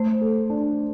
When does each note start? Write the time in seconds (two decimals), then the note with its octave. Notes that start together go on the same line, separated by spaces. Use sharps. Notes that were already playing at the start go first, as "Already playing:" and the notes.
Already playing: A3 C5
0.21 A4
0.50 D4